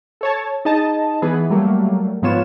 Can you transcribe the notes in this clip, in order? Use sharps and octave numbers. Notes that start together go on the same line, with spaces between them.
A4 C#5 A5
D#4 G#4 D#5 A5
E3 B3 G#4 B4
F#3 G3 A3 A#3
G#2 F3 B3 F4 C#5 E7